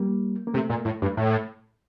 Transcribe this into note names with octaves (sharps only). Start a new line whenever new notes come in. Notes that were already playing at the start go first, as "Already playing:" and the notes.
Already playing: G3 A#3
A#3
C3 A3
A#2
A2
G2
A2